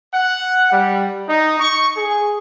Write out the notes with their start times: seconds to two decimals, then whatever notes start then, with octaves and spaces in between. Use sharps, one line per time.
0.14 F#5
0.71 G3
1.28 D#4
1.60 C#6
1.97 G#4